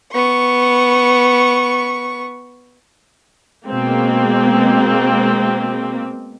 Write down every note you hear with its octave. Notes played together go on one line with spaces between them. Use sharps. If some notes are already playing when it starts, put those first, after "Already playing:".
B3 C#6
B2 G#3 A#3 C4